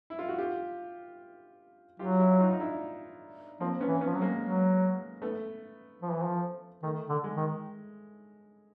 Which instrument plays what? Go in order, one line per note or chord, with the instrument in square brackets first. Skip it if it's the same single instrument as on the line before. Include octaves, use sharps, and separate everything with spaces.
[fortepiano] E4
F4
F#4
F4 G4
[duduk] F#3 [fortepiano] F4 G4
[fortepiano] E4 F#4
D#4 F4
D#4
D4 E4
[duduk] F3 [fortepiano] A#3 C4
[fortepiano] B3 C#4
[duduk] E3
[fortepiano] B3 C#4
[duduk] F3
F#3
[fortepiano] G#3 A#3
[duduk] F#3
[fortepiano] A3 B3
[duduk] F3
E3
F3
[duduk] D#3 [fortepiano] A3
[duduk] D3
[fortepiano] G#3
[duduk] D#3